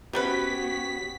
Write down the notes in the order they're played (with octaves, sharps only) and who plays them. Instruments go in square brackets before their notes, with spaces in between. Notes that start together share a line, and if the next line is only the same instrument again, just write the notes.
[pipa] C3 G3 B4 [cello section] B3 F#4 [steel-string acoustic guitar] C#4 G4 [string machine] B6